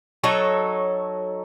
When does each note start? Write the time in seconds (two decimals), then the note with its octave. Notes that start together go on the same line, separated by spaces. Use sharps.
0.24 F#3 D#4 A4 C#5